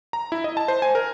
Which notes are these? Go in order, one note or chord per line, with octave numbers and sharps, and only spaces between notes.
A#5
E4
D#5
A5
C5
G#5
A#4